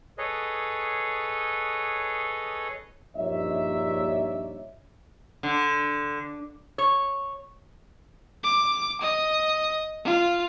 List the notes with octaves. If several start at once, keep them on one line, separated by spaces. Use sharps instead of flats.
G#4 A4 B4 C#5 D#5
A#1 G2 D#4 C#5 D5 E5
D3
C#5
D6
D#5
F4